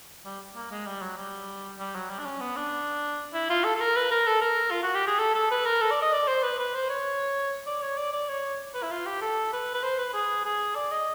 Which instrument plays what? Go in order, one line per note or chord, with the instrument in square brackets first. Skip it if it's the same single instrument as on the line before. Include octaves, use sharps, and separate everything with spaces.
[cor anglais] G3
A#3
G#3
G3
F#3
G3
G3
F#3
G3
D4
C#4
B3
D4
E4
F4
A4
A4
A#4
B4
A#4
A4
A#4
F4
F#4
G4
G#4
A4
A4
B4
A#4
A4
D5
D#5
D5
C5
B4
B4
C5
C#5
D5
C#5
D5
D5
C#5
B4
E4
F4
G4
A4
B4
B4
C5
B4
G#4
G#4
D5
D#5